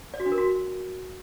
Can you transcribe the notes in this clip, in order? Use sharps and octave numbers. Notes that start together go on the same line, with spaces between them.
D5
F#4
D4
A#4
F#4